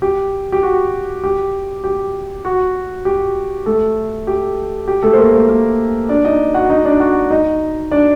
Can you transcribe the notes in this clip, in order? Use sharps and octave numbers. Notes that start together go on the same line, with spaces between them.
G4
G4
F#4
G4
G4
F#4
G4
A3 A4
G4
G4
A3 A4
C5
A#3 A#4
A#3 A#4
A#3 A#4
D4 D5
D#4 D#5
F#4 F#5
D#4 D#5
D4 D5
F#4 F#5
D#4 D#5
D4 D5